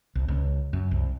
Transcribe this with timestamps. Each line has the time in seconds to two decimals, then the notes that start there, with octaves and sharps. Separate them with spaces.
0.15 C2
0.28 C#2
0.73 F#2
0.91 C2